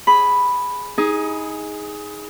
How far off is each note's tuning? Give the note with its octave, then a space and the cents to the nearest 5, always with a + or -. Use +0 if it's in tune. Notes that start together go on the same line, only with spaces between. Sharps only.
G#4 +0 B5 +0
D#4 +25 G#4 +0